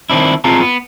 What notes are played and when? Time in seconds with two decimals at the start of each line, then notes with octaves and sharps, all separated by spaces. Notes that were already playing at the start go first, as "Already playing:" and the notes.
0.10 D#3 C4 D4 E4
0.44 C4 F4 G#4 F5 A5 A#5
0.61 B3